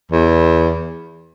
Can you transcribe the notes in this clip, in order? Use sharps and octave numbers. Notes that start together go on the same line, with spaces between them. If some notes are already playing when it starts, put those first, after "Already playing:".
E2